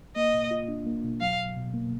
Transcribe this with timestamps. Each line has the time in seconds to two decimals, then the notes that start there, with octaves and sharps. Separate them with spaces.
0.16 A#3 D#5
0.34 B2
0.51 F4
0.68 D4
0.86 A#3
1.04 B2
1.21 F#3 F5
1.38 B2
1.57 B2
1.74 A#3